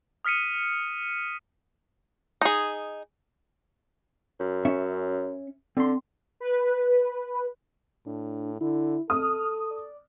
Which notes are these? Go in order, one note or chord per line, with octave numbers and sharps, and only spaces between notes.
D#6 F6 B6 C#7 D#7
D#4 G#4
F#2
C#4 E5
D3 C4 C6
B4
A2 D4
D3 E4
A4 D#6 F6
D5